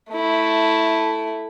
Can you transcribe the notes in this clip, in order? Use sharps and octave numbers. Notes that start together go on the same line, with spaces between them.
A3 E4